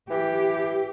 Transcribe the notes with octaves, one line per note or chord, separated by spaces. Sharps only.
E3 G4